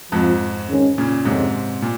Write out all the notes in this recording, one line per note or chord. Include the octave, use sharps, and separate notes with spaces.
F2 G#2 F3 C4 F4
D#3 G#3 C#4
A#2 C#3
F2 G#2 C3 D#3 G#3 C#4
A#2